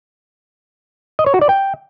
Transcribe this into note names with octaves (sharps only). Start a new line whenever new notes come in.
D#5
C#5
F#4
D5
G5